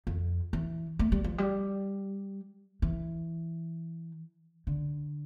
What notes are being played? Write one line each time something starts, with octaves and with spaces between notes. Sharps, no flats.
F2
E3
A3
G3
F3
G3
E3
D3